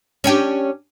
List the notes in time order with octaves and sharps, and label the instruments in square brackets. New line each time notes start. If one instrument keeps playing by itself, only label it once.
[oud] C#4 D4 G4